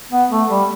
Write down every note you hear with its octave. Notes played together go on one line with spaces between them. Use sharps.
B3
A3
G3